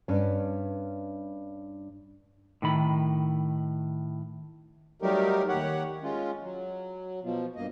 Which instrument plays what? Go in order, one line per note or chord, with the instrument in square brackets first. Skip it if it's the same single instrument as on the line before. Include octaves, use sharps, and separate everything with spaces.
[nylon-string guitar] G2 C#4
[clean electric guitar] A2 D#3 B5
[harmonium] F#3 G3 A3 D#4 G4 A#4
D#2 G4 C#5 F#5
G#3 C#4 F4
F#3
B2 F3
G2 A#3 D#5